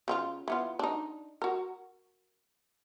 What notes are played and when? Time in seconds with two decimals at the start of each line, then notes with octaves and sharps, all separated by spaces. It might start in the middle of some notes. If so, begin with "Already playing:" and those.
0.08 C#3 C4 F4
0.48 E3 B3 F4
0.79 D4 D#4
1.42 F#4 A#4